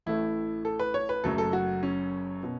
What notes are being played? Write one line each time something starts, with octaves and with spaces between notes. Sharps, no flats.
A1 A2 A3 E4
A4
B4
C#5
B4
F#1 F#2 F#3 A3 A4
A4
F#4
C#4
B2